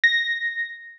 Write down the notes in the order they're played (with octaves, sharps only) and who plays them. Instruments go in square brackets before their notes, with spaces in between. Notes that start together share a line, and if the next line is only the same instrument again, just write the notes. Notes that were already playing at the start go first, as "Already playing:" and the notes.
[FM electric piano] A#6